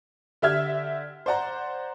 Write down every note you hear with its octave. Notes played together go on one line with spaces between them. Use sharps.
D3 G4 E5 F6 G#6
C5 D5 F#5 A#5